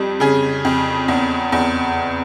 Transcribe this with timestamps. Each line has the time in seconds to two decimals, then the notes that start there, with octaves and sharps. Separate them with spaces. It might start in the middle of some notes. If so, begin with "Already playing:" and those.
Already playing: F2 G3
0.20 C#3 G#4
0.65 F2
1.08 E2
1.52 E2